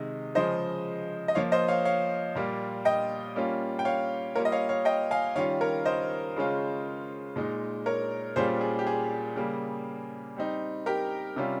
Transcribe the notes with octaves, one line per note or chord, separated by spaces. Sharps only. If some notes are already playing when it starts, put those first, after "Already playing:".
Already playing: C3 D#3 G#3 D#5
C#3 F3 G#3 C5 D#5
D#5
F3 A#3 F4 C#5 F5
C5 D#5
C#5 F5
C#5 F5
A#2 G3 A#3 F4
D#5 G5
G3 A#3 C#4 F4
G5
C#5 F5
G3 A#3 F4 A#4 C#5
D#5
C#5 F5
C#5 F5
D#5 G5
F5 G#5
D#3 G3 C#4 F4 C#5 F5
A#4 C#5
C5 D#5
C#3 G#3 C#4 F4
A#2 G#3 D#4
A#4 C#5
A#2 G3 C#4 F4 G#4 C5
G#4
G4
G#4
C#3 G3 A#3
G3 C4 D#4
G4 A#4
C3 G3 C#4 F4